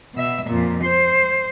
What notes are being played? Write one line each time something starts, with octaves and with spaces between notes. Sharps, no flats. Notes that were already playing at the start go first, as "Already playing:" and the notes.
B2 E5
F2 A#2
C5